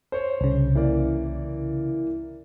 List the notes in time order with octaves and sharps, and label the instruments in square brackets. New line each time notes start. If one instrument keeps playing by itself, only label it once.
[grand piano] C5 C#5
[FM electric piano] C2 C#3
[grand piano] E3 A#3 D5